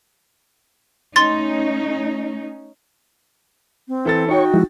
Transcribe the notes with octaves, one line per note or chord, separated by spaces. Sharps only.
A3 C#4 D#4 C6 A6
C4
E3 A4 A6
D#4 F#4 C#5 G5 C#6
F3 G#3 E4